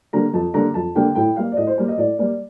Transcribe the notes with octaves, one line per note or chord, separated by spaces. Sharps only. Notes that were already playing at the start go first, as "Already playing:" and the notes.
D3 G3 A#3 A#5
F2 A5
D3 G3 A#3 A#5
F2 A5
D3 G3 A#3 G5
A2 G5
G3 A#3 F5
D5
A2 D#5
C5
G3 A#3
D#5
A2 D5
G3 A#3 D5